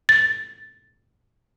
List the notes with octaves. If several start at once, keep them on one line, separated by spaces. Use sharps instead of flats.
A6